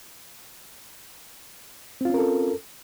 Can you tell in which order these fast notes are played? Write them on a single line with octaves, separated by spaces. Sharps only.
C4 F4 C#4 A#4 A4